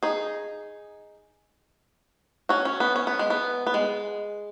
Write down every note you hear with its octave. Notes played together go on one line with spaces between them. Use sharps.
D#4 G#4
C#4 F#4
C#4
B3
C#4
B3
G#3
B3
B3
G#3